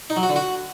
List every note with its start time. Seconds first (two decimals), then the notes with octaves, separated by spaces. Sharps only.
0.10 D#4
0.17 F#3
0.23 F#4
0.30 D3
0.36 F#4